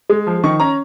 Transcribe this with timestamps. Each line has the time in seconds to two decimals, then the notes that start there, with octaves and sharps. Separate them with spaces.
0.10 G#3
0.27 F3
0.43 D#3 C#6
0.60 C#4 A#5